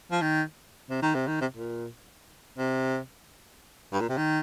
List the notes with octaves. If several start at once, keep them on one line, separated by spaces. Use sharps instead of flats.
F3
D#3
C3
D#3
C3
D#3
C3
A#2
C3
G2
A#2
C3
D#3